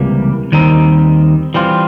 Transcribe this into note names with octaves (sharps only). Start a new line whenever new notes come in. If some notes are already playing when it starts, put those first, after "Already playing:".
Already playing: C#2 C3 E3 G3 A#3
D#2 D#3 G3 C4 D#4
E3 G3 C4 F4